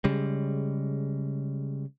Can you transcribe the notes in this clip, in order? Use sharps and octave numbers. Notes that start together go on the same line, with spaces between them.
C#3 G3 G#3